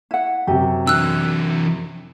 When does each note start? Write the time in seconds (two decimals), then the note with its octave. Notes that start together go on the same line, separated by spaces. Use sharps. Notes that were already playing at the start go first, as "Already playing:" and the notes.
0.11 E4 F#5
0.47 F#2 C3 G4
0.87 E3 D4 E6 F#6